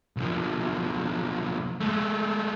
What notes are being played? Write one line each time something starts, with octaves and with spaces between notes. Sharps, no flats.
B1 F3
G#3 A3